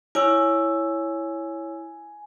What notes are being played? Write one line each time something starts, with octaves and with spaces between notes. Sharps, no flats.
E4 C#5 G#5 E6